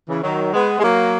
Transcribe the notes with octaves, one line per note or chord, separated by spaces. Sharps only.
C#3 E3
D#3 F#3
G#3 B3
G#3
F#3 A#3